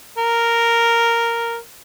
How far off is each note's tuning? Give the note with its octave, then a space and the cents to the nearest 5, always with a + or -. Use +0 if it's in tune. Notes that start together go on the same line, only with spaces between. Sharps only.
A#4 -5